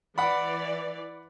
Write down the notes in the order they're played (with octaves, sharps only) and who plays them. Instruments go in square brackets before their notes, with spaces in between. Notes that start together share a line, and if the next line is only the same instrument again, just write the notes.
[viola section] E3 D5 [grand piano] F#5 B5